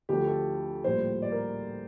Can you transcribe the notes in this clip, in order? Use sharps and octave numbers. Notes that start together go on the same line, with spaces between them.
D2 D3 F3 A3 G4
A4
A#1 A2 G3 C5
D5
A#4